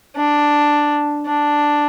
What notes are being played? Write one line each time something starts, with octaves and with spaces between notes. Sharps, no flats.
D4
D4